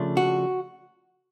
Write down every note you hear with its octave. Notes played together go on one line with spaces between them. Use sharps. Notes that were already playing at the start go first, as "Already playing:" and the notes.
Already playing: C#3 F3 A3 D4
F#4